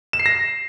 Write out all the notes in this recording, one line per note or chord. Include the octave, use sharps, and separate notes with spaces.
E7
C7
A#6